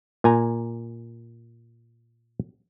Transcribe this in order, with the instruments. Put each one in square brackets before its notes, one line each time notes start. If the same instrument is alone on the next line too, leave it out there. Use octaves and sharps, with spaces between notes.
[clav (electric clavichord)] A#2 G#5 A#5